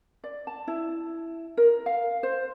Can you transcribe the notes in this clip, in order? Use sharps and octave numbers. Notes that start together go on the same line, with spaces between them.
D5
A5
E4
A#4
F5
C5